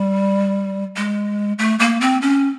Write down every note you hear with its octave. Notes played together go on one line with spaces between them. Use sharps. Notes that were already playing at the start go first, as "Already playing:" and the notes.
Already playing: G3
G#3
A3
A#3
C4
C#4